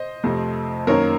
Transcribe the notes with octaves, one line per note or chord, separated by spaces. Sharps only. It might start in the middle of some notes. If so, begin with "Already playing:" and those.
Already playing: C5 D#5
F2 C3 F3 A3
F#2 D#3 A#3 A#4 C#5